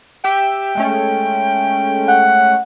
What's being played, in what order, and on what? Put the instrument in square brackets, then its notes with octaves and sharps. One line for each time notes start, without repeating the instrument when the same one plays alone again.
[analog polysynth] G4 E5 [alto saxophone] G5
[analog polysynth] G#3 A3 C#4
[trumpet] F#5